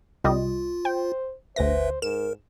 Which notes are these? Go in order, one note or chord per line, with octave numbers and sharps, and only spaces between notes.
C2 G3 F4 D#5
C5 G5
G1 D2 B4 C5 E5 A#6
G#2 A#4 E7